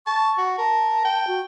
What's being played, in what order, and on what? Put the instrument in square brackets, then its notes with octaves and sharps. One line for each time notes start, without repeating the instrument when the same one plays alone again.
[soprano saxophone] A5 [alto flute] C#6
[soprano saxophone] F#4
[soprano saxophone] A#4 [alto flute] A5
[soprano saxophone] G5
[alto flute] F#4